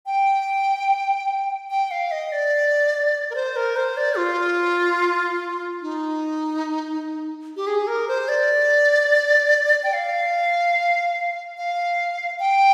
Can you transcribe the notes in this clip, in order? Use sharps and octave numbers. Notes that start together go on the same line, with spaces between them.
G5
G5
F5
D#5
D5
A#4
C5
A#4
C5
D5
F4
D#4
G4
G#4
A#4
C5
D5
G5
F5
F5
G5